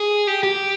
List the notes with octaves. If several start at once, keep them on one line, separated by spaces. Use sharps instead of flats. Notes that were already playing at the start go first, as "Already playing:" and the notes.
Already playing: G#4
G4
G4